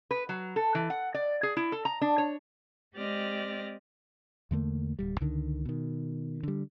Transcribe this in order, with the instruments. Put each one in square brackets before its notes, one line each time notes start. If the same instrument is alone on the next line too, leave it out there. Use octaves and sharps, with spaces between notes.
[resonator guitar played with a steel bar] B4
F#3
A4
E3
F#5
D5
G#4
E4
A4
A#5
D4
C#5
[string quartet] G#3 C4 G4 D5 D#5 F6
[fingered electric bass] E2 D3 A3 A#3
D1 G3
C#2 D3 D#3
B2 D#3
D3 G3